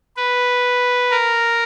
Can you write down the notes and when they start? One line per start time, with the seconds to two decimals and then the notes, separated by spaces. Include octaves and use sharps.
0.17 B4
1.11 A#4